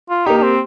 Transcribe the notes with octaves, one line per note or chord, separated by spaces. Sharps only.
F4
A#3 D#4 G4
D#4
C4